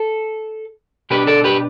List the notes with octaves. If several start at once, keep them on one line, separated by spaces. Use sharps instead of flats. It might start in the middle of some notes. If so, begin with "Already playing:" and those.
Already playing: A4
B2 B3 D4 G4 B4
A4 D5
G4 B4